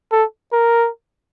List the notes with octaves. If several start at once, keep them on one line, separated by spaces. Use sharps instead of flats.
A4
A#4